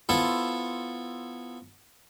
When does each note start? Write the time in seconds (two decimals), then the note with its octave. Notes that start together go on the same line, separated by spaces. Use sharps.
0.09 B3 E4 F4 A4 C5